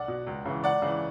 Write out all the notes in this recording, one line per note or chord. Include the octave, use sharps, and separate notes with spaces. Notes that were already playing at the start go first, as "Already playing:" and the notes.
Already playing: B1 D5 F#5
B2
C#2
C#3 E3
C#2 D5 F#5
C#3 E3